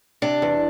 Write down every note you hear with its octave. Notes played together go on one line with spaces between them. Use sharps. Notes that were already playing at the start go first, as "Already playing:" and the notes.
C3 D4
E2